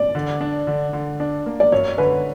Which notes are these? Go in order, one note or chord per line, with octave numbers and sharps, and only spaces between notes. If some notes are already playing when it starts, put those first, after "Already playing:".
Already playing: D5
D3
D4
D3
D3
D4
A#3
D5
F#2 C#5
D3 B4